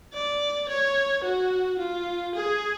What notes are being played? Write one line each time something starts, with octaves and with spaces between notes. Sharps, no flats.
D5
C#5
F#4
F4
G#4